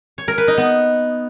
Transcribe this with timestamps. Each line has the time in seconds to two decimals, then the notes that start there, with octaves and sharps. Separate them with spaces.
0.18 C#5
0.28 A#4
0.38 B4
0.48 D#4
0.58 B3